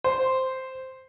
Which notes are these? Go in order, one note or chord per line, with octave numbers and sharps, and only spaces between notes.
C5